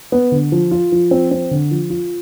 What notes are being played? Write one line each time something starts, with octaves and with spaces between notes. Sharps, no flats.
B3
D3
F3
F4
F3
C4
C4
D3
F3
F4